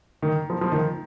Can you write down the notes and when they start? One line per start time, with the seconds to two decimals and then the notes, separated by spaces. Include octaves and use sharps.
0.22 D#3
0.50 F3
0.61 F3
0.72 D#3